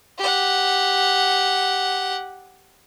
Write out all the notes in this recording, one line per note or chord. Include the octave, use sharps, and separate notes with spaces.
G4 F#5